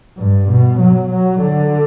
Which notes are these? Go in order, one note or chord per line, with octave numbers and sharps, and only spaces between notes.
G2
B2
F#3
F#3
D3